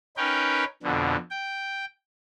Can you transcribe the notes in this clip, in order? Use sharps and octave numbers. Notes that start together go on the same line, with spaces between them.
C#4 D#4 A#4 B4 G5
F2 B2 D3
G5